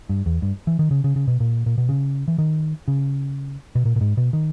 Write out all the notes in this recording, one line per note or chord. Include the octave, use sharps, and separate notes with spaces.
G2
E2
G2
E3
D#3
C#3
C#3
C#3
B2
A#2
A#2
B2
C#3
E3
D#3
C#3
B2
A#2
A#2
G#2
B2
D#3